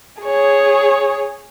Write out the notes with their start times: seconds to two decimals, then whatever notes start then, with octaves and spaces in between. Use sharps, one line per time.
0.22 G#4 C#5